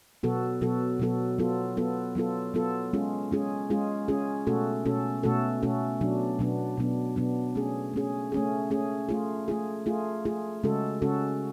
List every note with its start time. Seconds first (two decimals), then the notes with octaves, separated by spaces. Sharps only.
0.23 B2 F#3 B3 F#4 A4
0.61 B2 F#3 B3 F#4 A4
1.00 B2 F#3 B3 F#4 A4
1.38 F#3 B3 F4 A4
1.77 F#3 B3 F4 A4
2.15 F#3 B3 F4 A4
2.54 F#3 B3 F4 A4
2.93 G#3 C#4 F4 G#4
3.31 G#3 C#4 F4 G#4
3.70 G#3 C#4 F4 G#4
4.08 G#3 C#4 F4 G#4
4.47 B2 A3 C#4 F#4 A4
4.85 B2 A3 C#4 F#4 A4
5.23 B2 A3 C#4 F#4 A4
5.63 B2 A3 C#4 F#4 A4
6.01 B2 F#3 B3 D4
6.39 B2 F#3 B3 D4
6.77 B2 F#3 B3 D4
7.16 B2 F#3 B3 D4
7.55 A3 C#4 G#4
7.93 A3 C#4 G#4
8.32 A3 C#4 G#4
8.70 A3 C#4 G#4
9.09 A3 F4 G#4
9.48 A3 F4 G#4
9.86 A3 F4 G#4
10.25 A3 F4 G#4
10.63 C#3 G#3 C#4 F#4 A4
11.02 C#3 G#3 C#4 F#4 A4